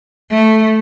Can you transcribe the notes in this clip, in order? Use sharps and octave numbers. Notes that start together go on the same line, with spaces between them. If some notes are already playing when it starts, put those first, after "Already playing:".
A3